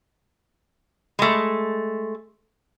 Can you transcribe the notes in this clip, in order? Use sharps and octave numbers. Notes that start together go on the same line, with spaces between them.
G#3 A3